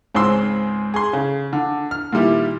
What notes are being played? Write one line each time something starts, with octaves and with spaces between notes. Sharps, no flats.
C#2 G#2 C4 C6 E6
G#4 C6
C#3
D3
F6
A#2 D#3 G3 E4